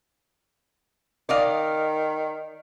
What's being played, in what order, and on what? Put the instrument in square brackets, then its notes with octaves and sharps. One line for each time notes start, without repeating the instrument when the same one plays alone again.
[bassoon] D#3 [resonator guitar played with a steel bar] D5 D#5 F5